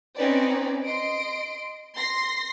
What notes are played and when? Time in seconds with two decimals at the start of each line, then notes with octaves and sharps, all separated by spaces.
0.18 C4 C#4 D#4 B4 D5
0.85 D#5 C6 D7
1.95 C6 A#6 C7